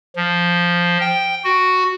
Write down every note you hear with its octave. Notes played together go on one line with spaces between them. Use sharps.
F3
G5
F#4